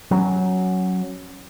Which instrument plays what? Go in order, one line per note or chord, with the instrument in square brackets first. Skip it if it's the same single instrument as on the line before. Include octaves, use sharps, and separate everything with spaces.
[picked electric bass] F#3 C#4